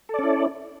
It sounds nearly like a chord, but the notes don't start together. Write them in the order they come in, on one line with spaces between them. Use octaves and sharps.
A4 D5 C#4 E4